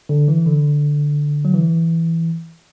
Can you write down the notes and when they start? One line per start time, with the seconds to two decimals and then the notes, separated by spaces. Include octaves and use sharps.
0.09 D3
0.28 E3
0.46 D3
1.45 F#3
1.54 E3